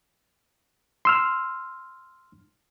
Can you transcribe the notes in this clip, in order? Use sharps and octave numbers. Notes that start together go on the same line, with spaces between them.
C6 E6 F6